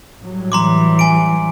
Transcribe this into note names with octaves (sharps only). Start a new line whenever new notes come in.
A2 F#3 G3
E3 A#5 C6 D6
G#5 D7